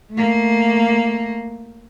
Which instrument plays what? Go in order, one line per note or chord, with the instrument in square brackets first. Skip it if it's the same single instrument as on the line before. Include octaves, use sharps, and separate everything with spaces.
[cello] A3 A#3